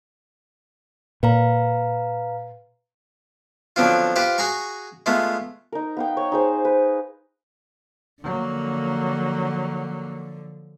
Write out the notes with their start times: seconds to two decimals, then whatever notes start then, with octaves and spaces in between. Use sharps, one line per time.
1.23 A#2 B4 F5 A#5
3.76 D3 F3 F#3 B3 C4 F4
4.16 F4 G4 B4 C5 F5
4.38 F#4 G#4 G#5 A#5 C#6
5.06 G#3 A3 B3 F4
5.72 D#4 A#4
5.97 B3 F5 G5
6.17 C#5 C#6
6.32 D#4 G#4 C5
6.65 B4
8.23 D3 F3 F#3 A#3